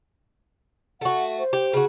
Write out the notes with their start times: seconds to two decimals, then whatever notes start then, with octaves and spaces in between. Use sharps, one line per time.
1.01 A3 F#4 F#5
1.39 C5
1.53 G4
1.73 C#3 F#4